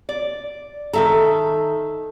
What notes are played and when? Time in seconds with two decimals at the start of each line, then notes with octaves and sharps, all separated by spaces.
0.09 D5
0.93 D#3 A4 E5 A#5